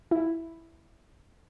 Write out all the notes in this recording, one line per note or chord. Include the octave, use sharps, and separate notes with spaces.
E4